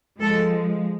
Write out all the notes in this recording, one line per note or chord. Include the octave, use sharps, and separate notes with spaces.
F3 G#3 A4